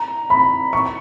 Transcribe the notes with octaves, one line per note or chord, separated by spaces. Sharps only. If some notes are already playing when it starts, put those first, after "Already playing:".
Already playing: A#5
B5
C#6